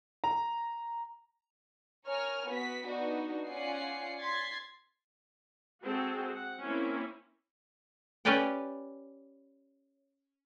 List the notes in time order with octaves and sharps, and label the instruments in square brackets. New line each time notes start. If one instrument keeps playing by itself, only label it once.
[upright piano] A#5
[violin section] A#4 C#5 G#5 F6
B3 F#4 B6
B3 D4 D#4 F#4
C#4 F4 D5 F#5 G#5 C7
C6 G#6 A6 B6 C7
[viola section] G#3 C4 F#4 G#4 A4
F#5
A#3 C4 C#4 E4
[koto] C#4 G4 B4 C#5 D5 G5